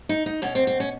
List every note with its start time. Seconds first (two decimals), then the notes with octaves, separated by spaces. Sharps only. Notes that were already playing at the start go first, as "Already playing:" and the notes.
0.09 D#4
0.26 D#4
0.42 B2 C#4
0.55 C4
0.67 C4
0.80 C#4